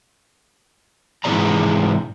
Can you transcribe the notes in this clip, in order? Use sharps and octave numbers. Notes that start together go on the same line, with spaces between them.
G#2 C3 E3 G#4 D5 A#5